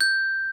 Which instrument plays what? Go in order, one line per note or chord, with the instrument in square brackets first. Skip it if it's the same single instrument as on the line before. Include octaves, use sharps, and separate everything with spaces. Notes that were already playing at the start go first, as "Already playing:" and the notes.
[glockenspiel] G6